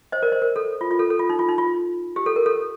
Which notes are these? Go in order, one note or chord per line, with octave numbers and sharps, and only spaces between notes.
C5 D#5
A#4 D5
C5
A#4
A4
F4
F4
A4
A4
F4
D#4
F4
D#4
F4
G4
A4
A#4
A4